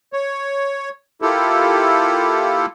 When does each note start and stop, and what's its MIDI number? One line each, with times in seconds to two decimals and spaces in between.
0.13 0.89 73
1.22 2.66 58
1.22 2.66 64
1.22 2.66 65
1.22 2.66 67
1.22 2.66 69